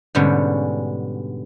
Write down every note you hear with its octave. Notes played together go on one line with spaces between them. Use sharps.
G#2 B2 D3 G3 C#4